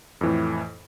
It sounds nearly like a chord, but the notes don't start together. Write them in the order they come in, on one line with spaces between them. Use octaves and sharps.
F2 E3 A2